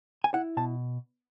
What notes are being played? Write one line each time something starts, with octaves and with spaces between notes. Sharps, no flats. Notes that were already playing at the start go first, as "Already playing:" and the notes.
G#5
E4 F#5
B2 A5